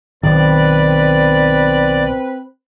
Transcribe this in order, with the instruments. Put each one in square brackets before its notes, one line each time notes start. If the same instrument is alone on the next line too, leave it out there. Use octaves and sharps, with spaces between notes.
[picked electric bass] B1 [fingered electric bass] D#3 [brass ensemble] C4 B4 [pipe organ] D5